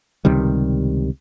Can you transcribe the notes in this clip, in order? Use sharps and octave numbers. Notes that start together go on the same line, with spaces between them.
C#2 C3 D#3 G3